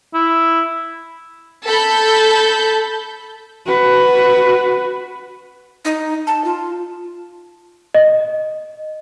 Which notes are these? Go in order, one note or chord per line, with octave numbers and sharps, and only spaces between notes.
E4
A4 B5 G6
F#4 B4
D#4
A5
F4
D#5